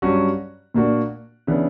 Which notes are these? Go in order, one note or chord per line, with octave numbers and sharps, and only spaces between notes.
G2 F#3 C#4 F#4
A#2 A#3 D4 F#4
C#3 E3 B3 D4